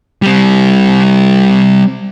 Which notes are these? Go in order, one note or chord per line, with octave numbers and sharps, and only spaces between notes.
G3 C4